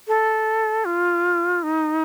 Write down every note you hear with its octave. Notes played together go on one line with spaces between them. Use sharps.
A4
F4
D#4